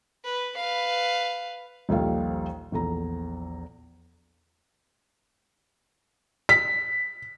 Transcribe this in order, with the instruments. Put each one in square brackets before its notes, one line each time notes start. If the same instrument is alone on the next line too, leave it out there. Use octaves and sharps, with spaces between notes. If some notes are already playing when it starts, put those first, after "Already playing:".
[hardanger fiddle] B4
B4 F5
[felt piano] A#1 D#2 F3 G3 A4 F5
A#1 E2 A4 A#5
B6